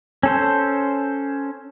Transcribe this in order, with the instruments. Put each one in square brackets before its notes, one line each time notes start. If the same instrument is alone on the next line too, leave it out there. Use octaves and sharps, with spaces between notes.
[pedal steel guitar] C#4 A4 C5